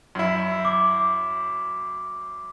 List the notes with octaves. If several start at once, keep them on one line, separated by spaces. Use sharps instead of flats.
F#2 E4
D6